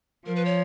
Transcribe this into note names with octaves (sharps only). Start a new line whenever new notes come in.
F3 A#4
B4
C#5